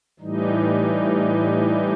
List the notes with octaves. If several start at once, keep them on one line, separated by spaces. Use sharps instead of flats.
A2 E3 G3 D#4